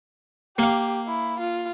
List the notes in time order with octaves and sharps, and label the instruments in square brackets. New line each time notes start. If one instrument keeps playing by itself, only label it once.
[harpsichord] A#3 F5 [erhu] G4
[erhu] E4
F4